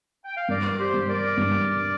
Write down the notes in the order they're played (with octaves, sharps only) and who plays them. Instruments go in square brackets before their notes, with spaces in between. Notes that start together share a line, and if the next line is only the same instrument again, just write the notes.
[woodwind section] G5
F5
[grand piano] G2 [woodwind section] A#4 D5
[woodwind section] G4 C5
[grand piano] G2
[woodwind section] A#4 D5
[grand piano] G2